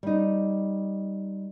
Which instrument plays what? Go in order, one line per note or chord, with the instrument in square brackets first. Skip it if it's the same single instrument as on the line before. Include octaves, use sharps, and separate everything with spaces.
[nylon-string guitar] G3 D#4